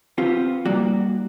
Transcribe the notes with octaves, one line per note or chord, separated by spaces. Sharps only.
B3 C4 F4 G4
G3 A#3 D#4 F#4 D5